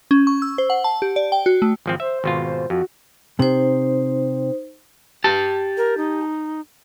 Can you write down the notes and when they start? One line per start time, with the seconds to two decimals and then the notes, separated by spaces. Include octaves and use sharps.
0.11 C#4
0.27 C#6
0.42 E6
0.58 C5
0.70 F#5
0.84 A5
1.02 G4
1.16 D5
1.32 G5
1.46 F#4
1.62 A3
1.86 G#1 F3 C4
2.00 C5 E5
2.24 G#1 B2 F4
2.44 C5
2.70 F2 F#4
3.39 C3 D#4 C5
5.24 G4 A5
5.77 A#4
5.98 D#4